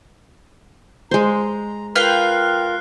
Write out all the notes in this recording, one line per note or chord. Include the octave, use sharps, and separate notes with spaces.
G#3 C5 A#5
F4 A#4 B4 F5 G5 F6 F#6 C7